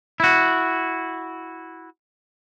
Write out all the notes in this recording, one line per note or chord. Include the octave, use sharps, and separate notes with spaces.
E4 F#4